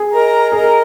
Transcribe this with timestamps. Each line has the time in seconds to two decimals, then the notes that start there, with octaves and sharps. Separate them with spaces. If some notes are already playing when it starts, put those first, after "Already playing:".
Already playing: G#4
0.11 A#4 D#5 A#5
0.52 G#4 A#4 D#5 A#5